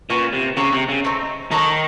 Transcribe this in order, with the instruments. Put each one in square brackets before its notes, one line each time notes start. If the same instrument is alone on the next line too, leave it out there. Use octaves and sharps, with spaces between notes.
[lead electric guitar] A#2 [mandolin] C#4 F#4 B4
[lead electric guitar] C3
[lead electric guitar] C#3 [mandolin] F#4 A#4 C#5 E5
[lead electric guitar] C3
C#3
[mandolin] A3 C4 D#4
[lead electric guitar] D#3 [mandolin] D#4 F#4 A4 C#5